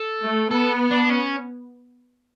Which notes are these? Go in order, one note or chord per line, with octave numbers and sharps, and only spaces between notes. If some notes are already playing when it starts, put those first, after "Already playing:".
Already playing: A4
A3
B3 A4
D4
C#4